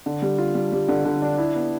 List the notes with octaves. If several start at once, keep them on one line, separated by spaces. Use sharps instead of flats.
D3
G3
F4
G3
G3
D3
D3
D4
E4
B3